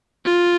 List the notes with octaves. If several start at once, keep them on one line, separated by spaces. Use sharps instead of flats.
F4